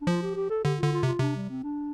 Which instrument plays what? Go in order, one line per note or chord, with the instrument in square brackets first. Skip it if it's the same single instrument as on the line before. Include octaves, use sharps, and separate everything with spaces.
[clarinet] D4
[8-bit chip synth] F3 [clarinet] F4
[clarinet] G4
G4
A4
[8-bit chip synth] D3 [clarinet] G4
[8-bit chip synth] D3 [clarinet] F4
[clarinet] F4
[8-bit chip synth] C3
[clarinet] F4
[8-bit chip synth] C3 [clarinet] D4
[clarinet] G3
C4
D4